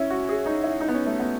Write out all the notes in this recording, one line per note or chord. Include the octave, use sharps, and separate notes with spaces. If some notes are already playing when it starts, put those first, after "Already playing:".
Already playing: C#4 E4
F#4
G#4
D#4
E4
D#4
B3
C#4
A3
B3